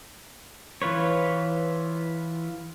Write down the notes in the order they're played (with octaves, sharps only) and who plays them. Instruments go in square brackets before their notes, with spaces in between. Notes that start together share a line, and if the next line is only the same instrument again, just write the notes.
[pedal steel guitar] E3 F4 B4 C#5